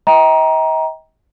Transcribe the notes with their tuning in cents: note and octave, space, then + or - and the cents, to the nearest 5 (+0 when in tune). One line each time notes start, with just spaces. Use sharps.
D#5 +45 G5 +0 A#5 +15